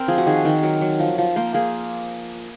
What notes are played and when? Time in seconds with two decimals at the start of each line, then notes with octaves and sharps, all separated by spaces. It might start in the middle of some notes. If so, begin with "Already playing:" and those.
Already playing: C4 A#4 C5
0.08 F3 G#4
0.18 F#4
0.26 D#3 G#4
0.45 D#3
0.63 F#3 A#4
0.81 F#3
1.00 F3
1.18 F3
1.36 A#3 C5
1.54 A#3 G#4